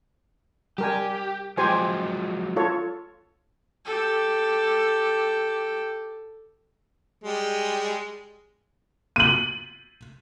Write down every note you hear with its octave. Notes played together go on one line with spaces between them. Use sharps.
G3 G4 A#4 G#5
F3 F#3 G#3 G4 C5 G#5
F4 A4 C#5
G4 A4
G3 G#3
D#7 F#7